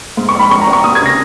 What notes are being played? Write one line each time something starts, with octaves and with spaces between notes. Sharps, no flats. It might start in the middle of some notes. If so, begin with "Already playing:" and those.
G#2
C#6
A#1 B5
G#1 C#6
A#5
G#1
C#6
D#2 D#6
G#6
C#3 A#6